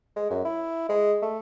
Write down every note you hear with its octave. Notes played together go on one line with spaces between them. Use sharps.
G#3
F#2
E4
G#3
A3